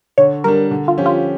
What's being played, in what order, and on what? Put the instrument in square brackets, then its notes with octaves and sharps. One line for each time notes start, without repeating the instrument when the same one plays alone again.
[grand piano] D3 [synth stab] C#5
[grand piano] G3 D4 [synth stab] A#4
[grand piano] D3
[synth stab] F4
[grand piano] F3 C#4 G4
[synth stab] F4